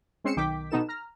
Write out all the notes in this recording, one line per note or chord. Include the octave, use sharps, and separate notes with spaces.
G#3 C4 C#4 C7 C#7 E7
B1 D#3 G5 D6 B6
B2 B3 D#4 A4 E7
A#5 F6